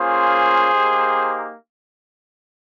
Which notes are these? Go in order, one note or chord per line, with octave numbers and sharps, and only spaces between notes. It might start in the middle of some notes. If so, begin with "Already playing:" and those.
Already playing: A#3 C#4 F4 G#4 C5
A#3 D#4 G4